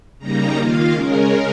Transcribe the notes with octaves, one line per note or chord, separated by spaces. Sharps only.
C#3 G3 A#3 D#4 A#5
D#3 A#3 F4 F5
C#3 G#3 C#4 A#4